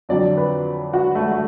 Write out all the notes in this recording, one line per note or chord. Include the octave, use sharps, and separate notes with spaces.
F2 D3 F#3 D5
B4
F#4
A3
A3